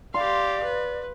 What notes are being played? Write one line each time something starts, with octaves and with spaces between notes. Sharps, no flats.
G4 D5 F5 C6
B4